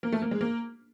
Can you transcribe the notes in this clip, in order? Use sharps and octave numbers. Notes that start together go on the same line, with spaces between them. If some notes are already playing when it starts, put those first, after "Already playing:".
A#3
A3
A#3
G#3
A#3